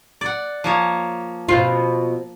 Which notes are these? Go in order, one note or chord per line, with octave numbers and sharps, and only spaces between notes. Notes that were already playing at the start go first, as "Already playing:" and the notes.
D5 F#5
F3 A#3 C#5
B2 C4 F4